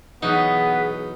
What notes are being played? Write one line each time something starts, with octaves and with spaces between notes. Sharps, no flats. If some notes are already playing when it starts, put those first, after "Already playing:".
E2 B2 F#3 B3 D#4 G#4